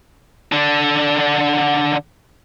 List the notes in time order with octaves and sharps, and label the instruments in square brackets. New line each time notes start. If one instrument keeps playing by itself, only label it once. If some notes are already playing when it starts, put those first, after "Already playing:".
[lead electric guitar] D3 D4